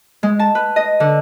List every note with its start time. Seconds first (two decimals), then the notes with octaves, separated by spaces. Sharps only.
0.23 G#3
0.39 A5
0.55 B4
0.76 D#5
1.00 D3